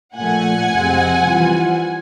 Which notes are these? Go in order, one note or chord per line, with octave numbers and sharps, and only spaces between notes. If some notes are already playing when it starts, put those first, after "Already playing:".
A#2 F3 A3 F#5 G#5
F2 C3 F3 G#3 C4
E3 G3 C4 F4